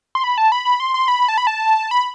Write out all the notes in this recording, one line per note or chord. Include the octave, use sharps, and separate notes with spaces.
C6
B5
A5
B5
B5
C6
C6
B5
A5
B5
A5
B5